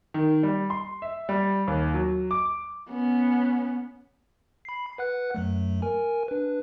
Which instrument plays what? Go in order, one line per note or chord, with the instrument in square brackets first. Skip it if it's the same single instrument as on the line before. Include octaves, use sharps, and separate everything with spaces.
[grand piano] D#3
G3
C6
E5
G3
D#2
F#3
D6
[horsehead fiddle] B3 C#4
[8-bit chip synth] B5 C7
B4 F#5 F#6
F#2 F#3 A3
A#4 G#5
D4 B4